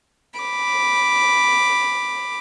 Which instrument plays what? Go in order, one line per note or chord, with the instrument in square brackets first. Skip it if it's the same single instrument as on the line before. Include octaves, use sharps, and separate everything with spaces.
[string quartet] B5 D6